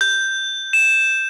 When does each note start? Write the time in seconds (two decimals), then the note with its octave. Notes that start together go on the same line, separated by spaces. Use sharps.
0.01 G6
0.73 E7